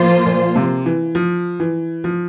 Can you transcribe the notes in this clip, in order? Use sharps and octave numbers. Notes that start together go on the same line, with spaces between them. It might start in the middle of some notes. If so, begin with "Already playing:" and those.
Already playing: A2 F3 A#3 F4 C5
A#2
C3
E3
F3
E3
F3